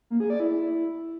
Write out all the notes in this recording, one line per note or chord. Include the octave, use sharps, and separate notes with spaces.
A#3
G#4
D5
E4